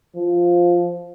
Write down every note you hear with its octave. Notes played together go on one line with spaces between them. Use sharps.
F3